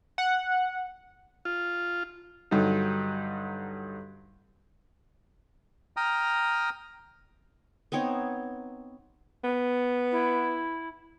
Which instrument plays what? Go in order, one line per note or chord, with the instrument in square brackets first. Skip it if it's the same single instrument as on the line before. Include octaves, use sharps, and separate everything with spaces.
[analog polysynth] F#5
[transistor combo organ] F4
[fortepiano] G2 D3 F#3 D#4
[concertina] G5 A#5 D#6 F6
[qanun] B3 C4 D#4 C#5
[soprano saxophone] B3
[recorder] E4